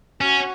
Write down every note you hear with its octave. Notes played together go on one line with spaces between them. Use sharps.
C#4 F#4